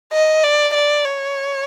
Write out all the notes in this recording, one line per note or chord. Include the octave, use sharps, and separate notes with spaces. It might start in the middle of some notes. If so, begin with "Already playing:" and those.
D#5
D5
D5
C#5